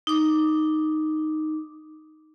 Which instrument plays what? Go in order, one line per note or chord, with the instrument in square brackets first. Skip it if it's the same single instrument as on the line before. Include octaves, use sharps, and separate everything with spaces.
[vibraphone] D#4 D6